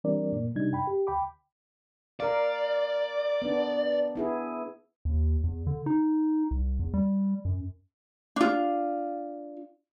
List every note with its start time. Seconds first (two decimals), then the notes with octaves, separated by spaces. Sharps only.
0.04 E3 G3 C4 D4 A#4 D5
0.32 F#2 A#2 A#3
0.55 C3 F#3 G3 D4 D#4 G#6
0.72 F#2 G5 B5
0.87 G4
1.07 D2 G5 B5 D6
2.20 A#4 D5 F5
3.42 B3 D4
4.15 B3 E4 G#4
5.05 D#2
5.44 E2
5.67 D3
5.86 D#4
6.51 C2
6.79 E2
6.94 G3
7.45 F#2
8.36 D4 F4